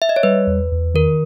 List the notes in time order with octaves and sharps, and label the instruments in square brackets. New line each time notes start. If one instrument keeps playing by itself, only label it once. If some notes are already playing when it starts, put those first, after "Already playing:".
[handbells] E5
D#5
C#5
[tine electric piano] G3 [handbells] B4
[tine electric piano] E2
E2
[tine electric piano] D#3 [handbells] A#4